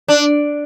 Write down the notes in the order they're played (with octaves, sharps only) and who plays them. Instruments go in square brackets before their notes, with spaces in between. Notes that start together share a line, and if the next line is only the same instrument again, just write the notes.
[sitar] D4